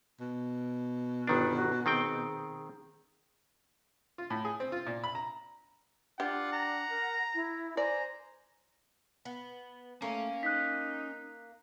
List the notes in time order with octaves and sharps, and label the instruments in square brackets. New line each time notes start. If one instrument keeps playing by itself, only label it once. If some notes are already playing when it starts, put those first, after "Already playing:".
[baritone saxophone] B2
[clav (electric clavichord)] G1 D#3 D4 [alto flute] B4
[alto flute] F#4
[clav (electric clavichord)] D#3 C4 G5 [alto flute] G#4
[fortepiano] F4
A2
G#4
C4
F4
A#2
B5
A#5
[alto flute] D4 [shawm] F4 [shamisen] G4 [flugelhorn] F#5
[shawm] A#5
[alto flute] A#4
E4
[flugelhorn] C5 [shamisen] D5 [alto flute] G#5 [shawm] A#5
[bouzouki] B3
[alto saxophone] A3 [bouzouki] A#3 [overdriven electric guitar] C#4
[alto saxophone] D#4 [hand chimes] F#6 B6